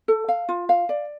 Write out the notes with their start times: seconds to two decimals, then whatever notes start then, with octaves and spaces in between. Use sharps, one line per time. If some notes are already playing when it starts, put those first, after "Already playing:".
0.08 A4
0.28 F5
0.49 F4
0.69 F5
0.89 D5